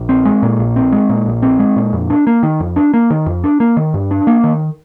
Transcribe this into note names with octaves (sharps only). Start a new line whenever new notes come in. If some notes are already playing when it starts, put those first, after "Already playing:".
Already playing: A#1
C4
G#3
A#2
A#1
C4
G#3
A#2
A#1
C4
G#3
A#2
F2
D4
A#3
D#3
F2
D4
A#3
D#3
F2
D4
A#3
D#3
G2
D4
A#3
D#3